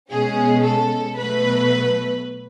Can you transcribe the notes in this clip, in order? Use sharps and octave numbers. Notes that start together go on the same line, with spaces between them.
B2 G#3 C#4 G#4
A4
B2 F#3 A3 B4